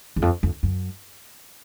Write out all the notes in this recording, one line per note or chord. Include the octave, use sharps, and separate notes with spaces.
E2
F2
F2
F#2